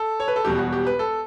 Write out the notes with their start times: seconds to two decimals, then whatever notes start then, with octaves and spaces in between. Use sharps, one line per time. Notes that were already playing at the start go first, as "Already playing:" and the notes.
Already playing: A4
0.20 C#5
0.28 B4
0.36 A4
0.45 E1 E2 B2 G3 G4
0.59 F#4
0.73 G4
0.87 B4
0.99 A4